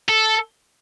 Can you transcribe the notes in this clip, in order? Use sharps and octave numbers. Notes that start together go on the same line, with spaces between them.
A4